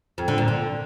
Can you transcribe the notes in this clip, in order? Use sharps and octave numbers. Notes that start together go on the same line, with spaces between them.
F2
D3
A#2
D3